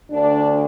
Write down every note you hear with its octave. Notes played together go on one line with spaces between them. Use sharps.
D2 D3 D4